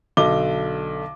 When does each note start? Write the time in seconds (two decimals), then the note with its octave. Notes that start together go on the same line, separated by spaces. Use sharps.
0.17 B1 D3 D#5 D6 G7